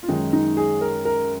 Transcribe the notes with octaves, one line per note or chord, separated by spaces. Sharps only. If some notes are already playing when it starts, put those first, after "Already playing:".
F4
F#2 D#3 G#3 D#4
D#4
G#4
A#4
A#4